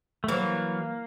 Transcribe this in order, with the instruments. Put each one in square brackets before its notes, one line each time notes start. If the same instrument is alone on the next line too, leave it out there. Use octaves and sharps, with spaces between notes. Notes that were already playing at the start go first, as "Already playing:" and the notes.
[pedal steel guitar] A3
[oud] E3 F#3 [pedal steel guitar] A#3